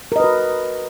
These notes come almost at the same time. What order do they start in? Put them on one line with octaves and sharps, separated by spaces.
A#4 D#5 B4 F#4